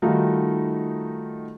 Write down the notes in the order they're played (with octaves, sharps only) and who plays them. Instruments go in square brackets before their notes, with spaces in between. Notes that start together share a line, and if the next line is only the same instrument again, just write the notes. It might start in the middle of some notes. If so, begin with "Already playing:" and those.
[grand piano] D#3 G3 A3 D#4 F4 F#4